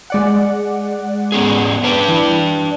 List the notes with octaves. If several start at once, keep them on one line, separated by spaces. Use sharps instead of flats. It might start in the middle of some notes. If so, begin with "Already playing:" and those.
G#3 D5 F#5
B3 C#4 G#4
D4 B4 D5
E3